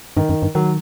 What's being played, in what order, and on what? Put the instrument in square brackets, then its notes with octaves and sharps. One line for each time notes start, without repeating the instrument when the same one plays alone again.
[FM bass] G2 [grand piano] D#3
[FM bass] F#2
G2
[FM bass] D#3 [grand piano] F#3